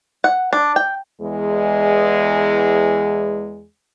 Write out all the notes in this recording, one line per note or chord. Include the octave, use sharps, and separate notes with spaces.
F#5
D4
G5
E2 G#3